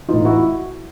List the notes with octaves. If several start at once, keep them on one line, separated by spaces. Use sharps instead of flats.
A2 E3 D#4 F4
E4 F#4